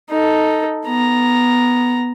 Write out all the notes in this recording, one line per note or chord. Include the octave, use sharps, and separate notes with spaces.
D#4 A4
B3 A#5